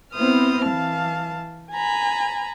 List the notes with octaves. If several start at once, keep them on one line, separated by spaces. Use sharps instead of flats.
B3 C4 E4 C5 D#6 F6
E3 F5 A5
G#5 A#5 B5